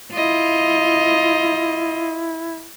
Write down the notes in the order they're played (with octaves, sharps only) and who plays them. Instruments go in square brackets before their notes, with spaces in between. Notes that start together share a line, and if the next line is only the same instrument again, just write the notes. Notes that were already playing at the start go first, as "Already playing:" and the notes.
[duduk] E4 [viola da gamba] F4 D#5